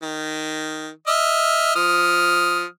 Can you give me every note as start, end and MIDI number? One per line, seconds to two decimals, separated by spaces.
0.03 0.89 51
1.07 1.71 75
1.07 1.71 76
1.07 1.71 89
1.76 2.65 53
1.76 2.65 87
1.76 2.65 89